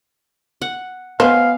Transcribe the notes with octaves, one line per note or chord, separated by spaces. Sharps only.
F#5
B3 B4 C5 D#5 F5 G#5